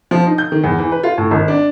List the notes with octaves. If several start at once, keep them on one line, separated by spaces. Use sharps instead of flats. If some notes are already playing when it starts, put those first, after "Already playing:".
F3
D#4
G6
D#3
E2
E3
B4
F4
A2
G#1
D4